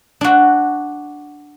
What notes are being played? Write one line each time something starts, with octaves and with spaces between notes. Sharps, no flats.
D4 F#4